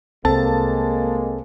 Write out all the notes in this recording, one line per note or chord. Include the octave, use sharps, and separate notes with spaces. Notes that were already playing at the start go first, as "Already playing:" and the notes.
C2 G#3 A#3 C4 A4 A5